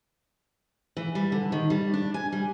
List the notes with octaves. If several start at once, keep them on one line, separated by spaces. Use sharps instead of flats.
E3
G3
D3
D#3
G3
D4
G#5
G3